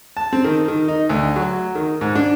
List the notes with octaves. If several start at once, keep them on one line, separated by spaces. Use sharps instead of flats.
A5
C4
D#3
D#3
D#4
D2
F#3
D#3
G#2
D4